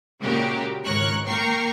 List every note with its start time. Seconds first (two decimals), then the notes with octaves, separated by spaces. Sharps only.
0.21 A#2 C#3 G#3 F#4 G4 A#4
0.85 G#1 C#2 A#4 C#5 C#6 F#6
1.27 A#3 A#4 G5 A#5 C#6 C7